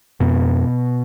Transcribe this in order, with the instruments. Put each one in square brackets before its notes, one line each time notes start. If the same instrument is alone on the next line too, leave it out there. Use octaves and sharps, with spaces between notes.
[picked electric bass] F2 B2 B3